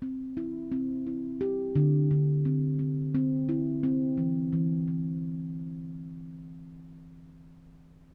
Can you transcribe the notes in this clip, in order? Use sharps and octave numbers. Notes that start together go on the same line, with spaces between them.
C4
E4
C4
E4
G4
D3
D3
C4
C4
C4
E4
C4
E3
E3
E3